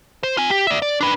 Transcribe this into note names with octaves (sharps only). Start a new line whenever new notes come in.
C5
F4 G#5
G4
D5 E5
D5
D4 B4